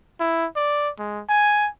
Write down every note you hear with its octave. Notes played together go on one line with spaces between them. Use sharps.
E4
D5
G#3
G#5